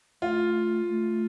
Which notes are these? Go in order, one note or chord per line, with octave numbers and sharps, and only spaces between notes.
A3 F4
A3